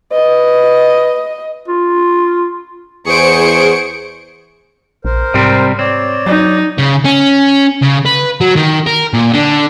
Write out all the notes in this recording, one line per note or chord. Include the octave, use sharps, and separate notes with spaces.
B4 D#5
F4
E2 G#4 C5 C#6 D7
A#1 A#4 C5
G#2 C3 G3 C4
C4 C#5 D5
F#3 D#4
C#3
C#4
C#3
B4
F#3
D#3
A#4
A#2
D3